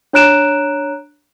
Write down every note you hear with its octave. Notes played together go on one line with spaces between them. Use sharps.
D4 C#5 A#5 F#6 D7 E7